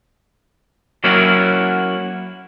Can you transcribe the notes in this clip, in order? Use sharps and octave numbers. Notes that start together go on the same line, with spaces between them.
F#3 A#3 C#4 E4 F#4